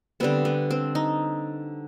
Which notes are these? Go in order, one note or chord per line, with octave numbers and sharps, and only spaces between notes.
D3 G3 B3 C4
B3
C4
D#4